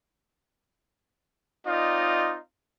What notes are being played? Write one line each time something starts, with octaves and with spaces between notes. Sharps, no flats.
C4 D#4 F4 D5 D#5